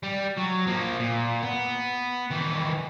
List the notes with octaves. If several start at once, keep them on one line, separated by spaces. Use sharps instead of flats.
G3
F#3
F3 A#3
A#2
B3
D#3 E3